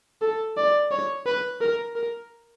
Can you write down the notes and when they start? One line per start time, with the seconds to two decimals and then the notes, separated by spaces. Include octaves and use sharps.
0.22 A4
0.57 D5
0.91 C#5
1.26 B4
1.61 A#4
1.96 A#4